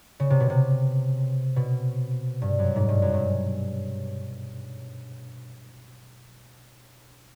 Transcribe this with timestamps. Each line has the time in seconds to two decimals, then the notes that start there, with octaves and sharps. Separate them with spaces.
0.20 C#3
0.30 C3
0.40 B2
0.50 C3
1.56 B2
2.42 G2
2.59 F#2
2.76 G#2
2.89 G2
3.02 F#2
3.14 G2